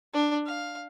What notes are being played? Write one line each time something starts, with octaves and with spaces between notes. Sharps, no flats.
D4
F5